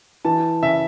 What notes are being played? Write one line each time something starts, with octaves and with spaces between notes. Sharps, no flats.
E3 A5
C#3 E5